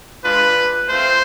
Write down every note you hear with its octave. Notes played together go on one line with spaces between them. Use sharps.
G#3 D4 F4 B4
A3 C4 F4 C5